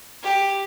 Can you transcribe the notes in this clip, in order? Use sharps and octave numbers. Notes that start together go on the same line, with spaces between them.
G4